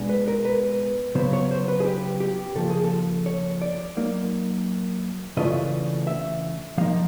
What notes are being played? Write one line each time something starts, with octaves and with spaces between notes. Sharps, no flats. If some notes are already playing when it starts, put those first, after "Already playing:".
Already playing: B2 G#3 B3 D4
B4
A#4
B4
C#3 F#3 B3 C5
C#5
C5
B4
G#4
G4
G4
C#3 F3 A#3 A4
G#4
A4
C#5
D5
F#3 A#3 D#4
C#3 E3 A3 D4 F4 D#5
E5
F3 A#3 D#4 F5